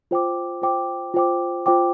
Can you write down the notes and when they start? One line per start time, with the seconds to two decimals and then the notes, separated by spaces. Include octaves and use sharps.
0.11 F4 C5 G5 D6
0.62 F4 C5 G5 D6
1.14 F4 C5 G5 D6
1.66 F4 C5 G5 D6